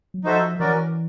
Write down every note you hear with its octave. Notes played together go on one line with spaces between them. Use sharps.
F#3
F3 D#4 F#4 A4 C5 E5
E3 C#4 F#4 A#4 D5